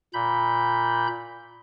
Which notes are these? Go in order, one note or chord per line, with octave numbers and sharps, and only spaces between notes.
A#2 B5 G6